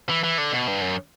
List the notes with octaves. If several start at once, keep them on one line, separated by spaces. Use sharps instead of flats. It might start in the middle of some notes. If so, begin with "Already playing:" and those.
E3
E3
D3
B2
G2
F#2